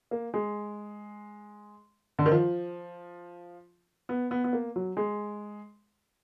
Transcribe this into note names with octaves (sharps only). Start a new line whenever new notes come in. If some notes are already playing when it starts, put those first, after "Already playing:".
A#3
G#3
D3
D#3
F3
B3
B3
B3
A#3
F#3
G#3